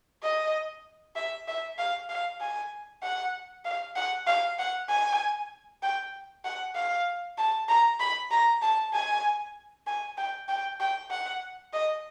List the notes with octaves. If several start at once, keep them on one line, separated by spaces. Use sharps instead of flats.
D#5
E5
E5
F5
F5
G#5
F#5
F5
F#5
F5
F#5
G#5
G5
F#5
F5
A5
A#5
B5
A#5
A5
G#5
G#5
G5
G5
G5
F#5
D#5